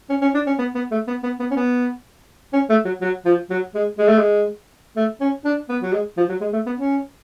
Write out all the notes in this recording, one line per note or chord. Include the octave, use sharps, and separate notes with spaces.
C#4
C#4
D4
C#4
B3
B3
A3
B3
B3
B3
C#4
B3
C#4
A3
F#3
F#3
F3
F#3
G#3
G#3
A3
G#3
A3
C#4
D4
B3
F#3
G#3
F3
F#3
G#3
A3
B3
C#4